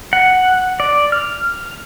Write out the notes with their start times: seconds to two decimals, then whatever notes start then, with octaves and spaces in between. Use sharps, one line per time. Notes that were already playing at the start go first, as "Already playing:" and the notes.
0.13 F#5
0.80 D5
1.12 F6